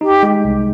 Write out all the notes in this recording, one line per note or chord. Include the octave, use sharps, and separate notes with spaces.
D#4 G4
G#3
C2